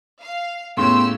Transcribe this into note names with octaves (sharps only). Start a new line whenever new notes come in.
F5
A2 C#3 B3 G4 C#5 C6 E6